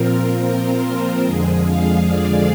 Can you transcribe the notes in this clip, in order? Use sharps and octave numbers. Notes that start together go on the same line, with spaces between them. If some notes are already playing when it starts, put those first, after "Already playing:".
Already playing: A#2 F3 C4 F4 A#4
C5
C5
F2 D3 F3 G#3 G#4
F5
D5